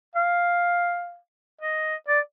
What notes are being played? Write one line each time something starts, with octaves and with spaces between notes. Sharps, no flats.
F5
D#5
D5